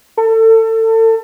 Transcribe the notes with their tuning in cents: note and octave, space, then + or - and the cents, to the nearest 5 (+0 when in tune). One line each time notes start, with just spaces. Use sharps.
A4 +30